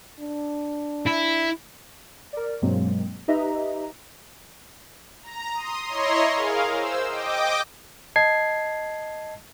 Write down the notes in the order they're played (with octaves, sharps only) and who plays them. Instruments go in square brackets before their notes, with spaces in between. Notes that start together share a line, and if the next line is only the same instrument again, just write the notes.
[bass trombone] D4
[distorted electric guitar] E4
[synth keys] A#4 D5
G2 B2 F#3 G#3 A#3 C4
D#4 G4 B4 D#5 E5 A#5
[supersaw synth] A#5
C6 D#6
E4 C#5 D#5 A#5 C6
G#4 A#4 F5
C5 E6
D#5 G5 D6
[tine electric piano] D#5 A5 G#6 C7